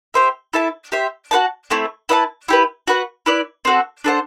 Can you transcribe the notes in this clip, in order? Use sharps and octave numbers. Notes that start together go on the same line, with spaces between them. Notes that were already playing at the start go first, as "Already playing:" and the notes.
G4 C5 E5
E4 A4 E5 A5
G4 C5 E5
F#4 B4 F#5 A5
A3 C4 E4
E4 B4 E5 A5
E4 G4 B4
F#4 B4 F#5
E4 B4 D5
C4 F#4 A4
D4 A4 C5 F#5